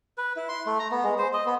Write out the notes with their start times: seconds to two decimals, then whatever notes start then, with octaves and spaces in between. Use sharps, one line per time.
0.18 B4
0.36 E4
0.49 C6
0.66 A3
0.79 A#5
0.91 B3
1.04 G#3
1.18 C5
1.33 D#5
1.46 B3